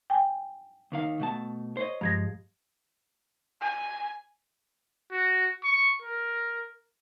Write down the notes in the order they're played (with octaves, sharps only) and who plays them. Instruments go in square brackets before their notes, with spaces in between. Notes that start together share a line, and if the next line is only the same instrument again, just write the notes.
[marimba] G5 G#5
[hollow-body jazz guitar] D#2 D#3 F5
B2 A3 A5
C5 C#5 D#5
[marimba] G2 G#6 A#6 [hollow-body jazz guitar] F3 G#3
[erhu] G#5
[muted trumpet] F#4
C#6
A#4